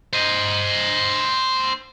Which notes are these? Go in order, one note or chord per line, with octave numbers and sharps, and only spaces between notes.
C5 D#5